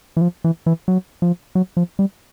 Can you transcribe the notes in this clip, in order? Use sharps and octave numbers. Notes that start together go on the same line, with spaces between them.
E3
F3
E3
E3
F#3
F3
F#3
F3
G3